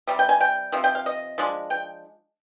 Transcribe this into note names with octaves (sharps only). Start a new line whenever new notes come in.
C3 G3
G5
G#5
G5
C3 F3
G5
F5
D#5
F3 G#3 D4
G5